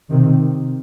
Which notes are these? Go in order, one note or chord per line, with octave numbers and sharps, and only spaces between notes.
C3 D#3